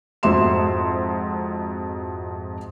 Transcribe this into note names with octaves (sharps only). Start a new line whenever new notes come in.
F2 G#2 F#4 E5 C6 E7